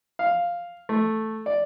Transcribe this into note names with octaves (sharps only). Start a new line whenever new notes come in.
F5
A3
D5